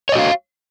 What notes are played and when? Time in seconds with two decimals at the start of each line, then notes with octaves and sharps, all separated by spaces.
0.09 C#5
0.12 D#5
0.16 F#4
0.19 F5